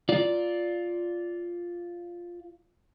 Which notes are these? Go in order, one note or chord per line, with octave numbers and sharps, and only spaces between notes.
F4 D5